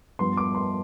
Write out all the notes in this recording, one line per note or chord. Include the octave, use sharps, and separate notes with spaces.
G2 F3 B3 C6
D6
C6